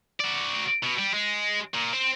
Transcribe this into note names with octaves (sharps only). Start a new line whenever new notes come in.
F#4 D5
B2
G3
G#3
A#2
C4